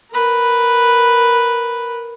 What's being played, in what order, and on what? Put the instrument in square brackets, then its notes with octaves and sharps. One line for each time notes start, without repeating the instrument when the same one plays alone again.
[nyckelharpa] A#4 B4